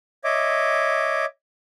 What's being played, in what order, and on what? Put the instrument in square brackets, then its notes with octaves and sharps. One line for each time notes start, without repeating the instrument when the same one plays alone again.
[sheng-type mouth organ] C#5 D#5 E5 D6